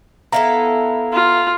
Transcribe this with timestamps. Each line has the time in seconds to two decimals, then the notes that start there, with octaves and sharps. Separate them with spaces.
0.32 B3 E4 A4 F5 A#5
1.13 F4